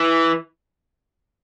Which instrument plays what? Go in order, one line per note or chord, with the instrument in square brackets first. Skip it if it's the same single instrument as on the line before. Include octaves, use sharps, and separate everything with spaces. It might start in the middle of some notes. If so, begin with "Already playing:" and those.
Already playing: [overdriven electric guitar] E3